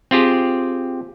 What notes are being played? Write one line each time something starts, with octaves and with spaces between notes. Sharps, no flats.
C4 F4 G4 G#4